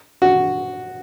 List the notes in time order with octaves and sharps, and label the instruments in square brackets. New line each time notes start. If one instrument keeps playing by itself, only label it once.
[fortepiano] F#4